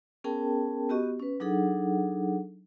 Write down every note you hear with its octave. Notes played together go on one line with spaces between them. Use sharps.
B3 C#4 G#4 A#4 G5 A5
B3 F#4 G4 D#5 C#6
C#4 B4
F#3 D4 D#4 G#4 A4 F#5